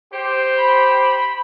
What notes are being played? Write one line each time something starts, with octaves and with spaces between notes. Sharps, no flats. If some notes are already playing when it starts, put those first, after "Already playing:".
G4 C5
B5